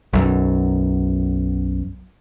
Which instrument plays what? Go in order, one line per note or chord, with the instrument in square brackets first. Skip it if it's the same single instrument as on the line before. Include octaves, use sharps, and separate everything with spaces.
[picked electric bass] B1 F#2